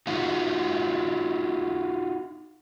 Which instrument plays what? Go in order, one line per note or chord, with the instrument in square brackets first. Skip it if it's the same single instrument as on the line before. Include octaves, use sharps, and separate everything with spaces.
[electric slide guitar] D#4 F4 F#4